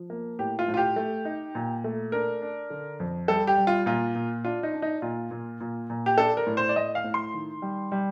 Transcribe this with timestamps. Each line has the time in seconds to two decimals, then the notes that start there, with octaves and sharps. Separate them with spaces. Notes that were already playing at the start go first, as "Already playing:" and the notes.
Already playing: F3
0.10 A#3
0.39 A2 G4
0.59 F4
0.68 A2
0.74 F4
0.77 G4
0.96 A3
1.25 D#4
1.55 A#2
1.84 A3
2.12 D4 A#4
2.42 D4
2.70 D3
3.00 F2
3.28 G3 A4
3.47 G4
3.57 G3
3.67 F4
3.86 A#2 F4
4.15 A#2
4.45 D4 F4
4.63 D#4
4.74 D4
4.82 D#4
5.02 A#2 F4
5.31 A#2
5.60 A#2
5.90 A#2
6.06 G4
6.18 D4 A4
6.37 A#4
6.47 A2
6.57 C5
6.69 D5
6.76 A2 D#5
6.95 F5
7.04 A2
7.14 C6
7.34 D#3
7.62 G3
7.92 G3